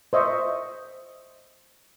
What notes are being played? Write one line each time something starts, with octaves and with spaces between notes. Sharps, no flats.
C5 D#5 E5 C#6